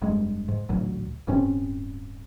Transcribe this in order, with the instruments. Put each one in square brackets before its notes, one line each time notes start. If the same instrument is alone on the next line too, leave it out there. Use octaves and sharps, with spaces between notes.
[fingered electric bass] F1 G2 G#3
G#2
A1 D2 A#2 F#3
D1 G2 C4 C#4